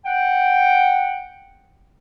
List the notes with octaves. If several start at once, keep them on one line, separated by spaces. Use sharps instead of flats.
F#5 G5